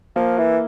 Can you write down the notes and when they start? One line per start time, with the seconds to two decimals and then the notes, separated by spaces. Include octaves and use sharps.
0.16 F3 A#3
0.38 E3 E4